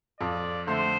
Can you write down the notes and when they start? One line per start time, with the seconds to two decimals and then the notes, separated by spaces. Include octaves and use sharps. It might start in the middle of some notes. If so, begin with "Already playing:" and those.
0.20 F2 D5
0.67 D3 A3 C5